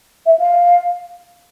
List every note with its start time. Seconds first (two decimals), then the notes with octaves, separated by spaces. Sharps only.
0.26 E5
0.39 F5